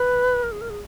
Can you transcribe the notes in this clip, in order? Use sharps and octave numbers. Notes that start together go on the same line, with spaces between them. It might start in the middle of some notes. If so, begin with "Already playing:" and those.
Already playing: B4
A#4
G#4
A#4
G#4